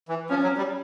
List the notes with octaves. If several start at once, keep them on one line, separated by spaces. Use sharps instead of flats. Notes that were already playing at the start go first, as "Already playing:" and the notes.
E3
F3 C#4
F#3
G3